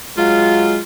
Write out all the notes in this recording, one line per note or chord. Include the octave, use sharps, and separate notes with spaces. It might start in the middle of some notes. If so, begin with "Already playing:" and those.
F#3 G#3 F4